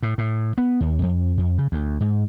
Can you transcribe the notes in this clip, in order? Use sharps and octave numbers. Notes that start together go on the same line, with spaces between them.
A2
A2
B3
D#2
F2
F2
C#3
D2
G#2